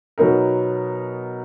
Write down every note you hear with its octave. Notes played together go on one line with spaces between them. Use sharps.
B2 F#3 B3 D#4 A#4